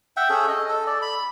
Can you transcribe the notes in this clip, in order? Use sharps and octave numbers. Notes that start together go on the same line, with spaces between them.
E5 F#5 G5
C#4 G#4 A4
D#5
A4
D5
B5